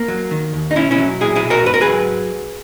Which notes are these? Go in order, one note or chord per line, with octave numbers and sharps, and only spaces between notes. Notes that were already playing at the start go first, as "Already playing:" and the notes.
Already playing: A#3
F#3
D#3
D#2
D#4
B1 C#4 E4
C#4 E4
F#3
A#2 E4 G#4
E4 G#4
B1
F#4 A#4
G#2 B4
A#4
G#4 B4
F#3